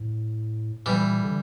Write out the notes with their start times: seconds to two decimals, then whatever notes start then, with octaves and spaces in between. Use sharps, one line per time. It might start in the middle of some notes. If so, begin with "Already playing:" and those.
Already playing: A2
0.86 A#2 E3 G3
1.23 D3